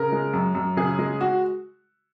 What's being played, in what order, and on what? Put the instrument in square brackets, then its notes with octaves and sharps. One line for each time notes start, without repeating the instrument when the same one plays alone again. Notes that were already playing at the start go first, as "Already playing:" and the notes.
Already playing: [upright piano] C#3 A#4
G#3
F#2
F#2
C#3 G#4
G#3
F#4